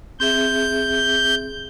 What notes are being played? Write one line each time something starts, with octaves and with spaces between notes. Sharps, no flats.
C4 G#4 E5 G6